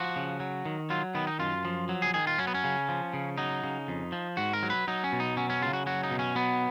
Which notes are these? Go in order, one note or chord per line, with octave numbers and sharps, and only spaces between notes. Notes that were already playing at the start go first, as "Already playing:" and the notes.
Already playing: F3 F#4
C#3
F#3
D#3
F#3 F4
D#3 B3
D#4
F#2 F4
F3
F#3
G#4
D#3 G#4
F4
F#3 C#4
B3
C#4
C#3
F3
C#3
F#3 D#4
C#3
F2
F3
G#2 F#4
A#4
F#3
B4
F#3 D#4
C#4
B2
D#4
F#3 C#4
C#4
C#3 F4
F#4
F#3 F#4
D#4
B2
C#4
F#3 B3